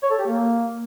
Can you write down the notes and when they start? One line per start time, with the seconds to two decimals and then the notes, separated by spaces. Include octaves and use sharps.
0.03 C#5
0.11 A4
0.19 G4
0.27 A#3